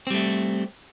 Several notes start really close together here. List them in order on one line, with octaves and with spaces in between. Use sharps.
C4 G3 A3